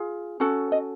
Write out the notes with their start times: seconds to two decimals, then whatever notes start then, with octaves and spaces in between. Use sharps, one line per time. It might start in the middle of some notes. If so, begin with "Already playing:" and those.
Already playing: F4 G#4
0.40 C#4 F#4 A4
0.72 D#5